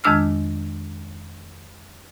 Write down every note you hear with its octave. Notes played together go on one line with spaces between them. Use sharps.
F2 D#3 G#3 D4 E6 F6